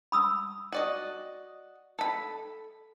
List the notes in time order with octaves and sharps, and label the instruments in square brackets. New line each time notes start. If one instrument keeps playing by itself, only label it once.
[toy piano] B5 D#6 E6
[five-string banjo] F#4 D5 D#5
A4 B5